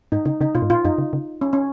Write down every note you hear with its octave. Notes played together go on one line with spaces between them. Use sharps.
G#2 D#4
C#3 D#4
C#3 D#4
B2 F4
G#2
A#2 F4
F#2 D#4
C#3
C#3
C#4
C#4